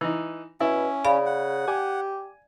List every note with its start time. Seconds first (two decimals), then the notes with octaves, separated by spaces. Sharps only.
0.01 E3 D#4
0.60 B2 C#4 E4
1.05 C#3 D5 F5 B5
1.26 F#5
1.68 G4 G#5